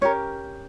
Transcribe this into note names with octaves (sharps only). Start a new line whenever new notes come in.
C#4 G4 A#4 C#5